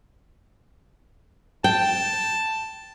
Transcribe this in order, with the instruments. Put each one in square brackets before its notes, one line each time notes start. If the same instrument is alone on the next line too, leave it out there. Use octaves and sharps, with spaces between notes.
[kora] G5 [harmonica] A5